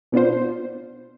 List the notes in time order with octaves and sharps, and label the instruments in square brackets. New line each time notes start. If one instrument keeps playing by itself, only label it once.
[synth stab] B2 B3 D4 F4 C5